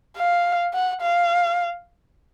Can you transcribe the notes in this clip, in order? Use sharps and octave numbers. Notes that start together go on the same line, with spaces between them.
F5
F#5
F5